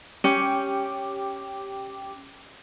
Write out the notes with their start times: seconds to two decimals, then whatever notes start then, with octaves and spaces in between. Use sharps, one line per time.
0.24 C#4 G4 G5 D6